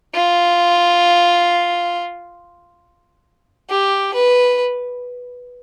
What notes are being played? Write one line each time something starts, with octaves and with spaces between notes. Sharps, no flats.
F4
G4
B4